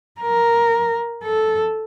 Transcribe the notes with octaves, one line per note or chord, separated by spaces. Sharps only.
A#4
A4